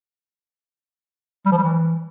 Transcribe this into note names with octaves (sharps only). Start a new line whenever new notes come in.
G3
F3
G3
E3